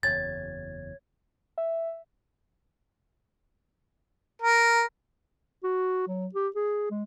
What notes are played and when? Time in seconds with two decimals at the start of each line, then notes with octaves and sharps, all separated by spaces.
0.03 F#1 E2 C#5 G#6 A6
1.58 E5
4.42 A#4
5.63 F#4
6.07 F#3
6.35 G4
6.56 G#4
6.91 G#3